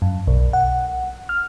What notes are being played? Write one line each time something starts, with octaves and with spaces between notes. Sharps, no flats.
F#2
B1
F#5
F6